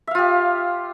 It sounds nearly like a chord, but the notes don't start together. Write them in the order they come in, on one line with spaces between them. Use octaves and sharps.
E5 F5 F4 G4